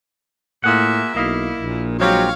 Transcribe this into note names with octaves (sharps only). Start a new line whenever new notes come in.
A2 A#3 F4 G#4 E5 F#5
B1 A#3 E4 D#5 F5
A#1 A#2
F#3 G#3 C4 G4 C#5 F5